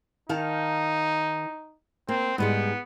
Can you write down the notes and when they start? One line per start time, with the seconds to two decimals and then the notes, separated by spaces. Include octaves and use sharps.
0.29 D#3 D#4 F5 A5
2.09 A#3 C4
2.38 G#2 G3 G#3 B3